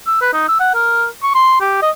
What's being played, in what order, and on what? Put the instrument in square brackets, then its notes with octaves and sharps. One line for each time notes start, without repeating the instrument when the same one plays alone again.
[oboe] E6
B4
D#4
E6
F#5
A#4
C#6
C6
G4
D#5